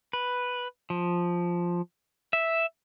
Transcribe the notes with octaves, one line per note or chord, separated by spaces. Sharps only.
B4
F3
E5